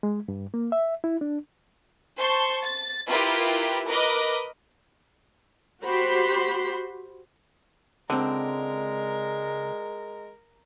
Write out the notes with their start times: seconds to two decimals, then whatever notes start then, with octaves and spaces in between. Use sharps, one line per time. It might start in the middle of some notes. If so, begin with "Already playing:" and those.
0.03 G#3
0.28 G2
0.54 A#3
0.72 E5
1.04 E4
1.21 D4
2.17 C5 A5 C6 C#6 G6
2.62 A6
3.06 E4 F4 G4 A#4 B4
3.86 A#4 B4 D#5 D6
5.83 F#4 G4 C5 B5 C6
8.10 C#2 D3 G#3 C4 A#4